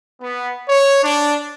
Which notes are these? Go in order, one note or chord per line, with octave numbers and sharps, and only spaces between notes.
B3
C#5
D4